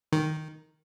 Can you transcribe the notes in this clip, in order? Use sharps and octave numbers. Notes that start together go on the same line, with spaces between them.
D#3